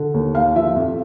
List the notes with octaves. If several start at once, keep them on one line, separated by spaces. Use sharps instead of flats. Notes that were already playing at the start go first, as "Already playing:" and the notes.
Already playing: D3
D#2
D#2 F5
F3 E5
F2